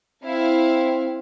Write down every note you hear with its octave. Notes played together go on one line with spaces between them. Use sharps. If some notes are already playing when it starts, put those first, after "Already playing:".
C4 E4 F5